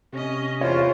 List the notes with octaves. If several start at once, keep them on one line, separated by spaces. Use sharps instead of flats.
C3 C#4 D#5 A#6
E2 E3 F4 C5 C#5